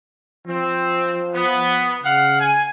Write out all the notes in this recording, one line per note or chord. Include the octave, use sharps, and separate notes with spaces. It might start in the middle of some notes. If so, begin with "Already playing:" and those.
F3 C4
B3
C#3 F5 F#5
G#5